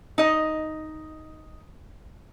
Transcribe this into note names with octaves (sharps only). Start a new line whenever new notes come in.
D#4 D#5